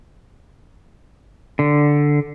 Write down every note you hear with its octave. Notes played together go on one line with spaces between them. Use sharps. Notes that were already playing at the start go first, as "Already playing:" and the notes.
D3